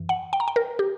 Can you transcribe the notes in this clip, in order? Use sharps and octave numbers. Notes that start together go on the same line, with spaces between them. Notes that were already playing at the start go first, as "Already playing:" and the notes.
Already playing: F#2 E3
F#5
G5
A#5
G5
A#4
G4